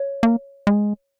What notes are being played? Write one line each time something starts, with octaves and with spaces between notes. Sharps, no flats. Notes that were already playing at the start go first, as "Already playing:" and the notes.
Already playing: C#5
A#3
G#3